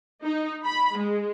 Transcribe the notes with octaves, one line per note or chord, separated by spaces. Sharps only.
D#4
B5
G#3